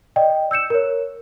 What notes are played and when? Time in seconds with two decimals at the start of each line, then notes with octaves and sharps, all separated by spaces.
0.16 D5 D#5 G5
0.51 E6 G6 C#7 E7
0.70 A#4 C#5